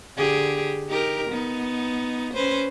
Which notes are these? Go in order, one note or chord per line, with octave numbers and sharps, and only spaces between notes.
D3 G4 G#4
D#4 G4 A#4
B3 D#4
C#4 B4 C5